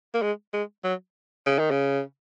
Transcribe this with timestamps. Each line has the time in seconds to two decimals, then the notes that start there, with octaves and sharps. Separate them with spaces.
0.14 A#3
0.22 G#3
0.53 G#3
0.84 F#3
1.46 C#3
1.58 D#3
1.71 C#3